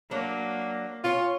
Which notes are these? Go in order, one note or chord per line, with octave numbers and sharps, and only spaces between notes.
F#3 A#3 D4
C#4 F4 C#5